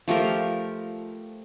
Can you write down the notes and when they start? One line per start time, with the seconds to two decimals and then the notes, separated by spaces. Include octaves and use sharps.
0.08 F3 A3 G4 A#4